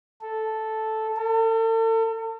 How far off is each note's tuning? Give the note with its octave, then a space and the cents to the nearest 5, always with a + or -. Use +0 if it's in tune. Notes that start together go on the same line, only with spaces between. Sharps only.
A4 -5
A4 +40